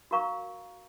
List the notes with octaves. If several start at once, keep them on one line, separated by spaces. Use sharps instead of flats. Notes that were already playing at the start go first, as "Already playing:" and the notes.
F#4 A#4 F5 A#5 C#6